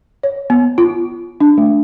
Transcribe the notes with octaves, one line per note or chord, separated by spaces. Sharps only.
C#5
B3
F4
D4
A3